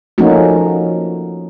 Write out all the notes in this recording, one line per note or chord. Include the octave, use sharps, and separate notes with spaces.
F3 A3 A#3 C#4 D#4 F#4